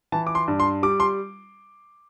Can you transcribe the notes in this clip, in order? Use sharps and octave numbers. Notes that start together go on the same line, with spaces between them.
E3 A5
D6
C6
G2
C6
G3 D6
C6